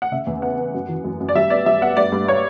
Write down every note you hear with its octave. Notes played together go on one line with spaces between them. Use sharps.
F#5
C#3 E5
E2
B3 F#5
B3
F#2
E3
F#2
F#2
D5
G3 E5
B3 D5
G3 E5
B3 F#5
G2 D5
G2
C#5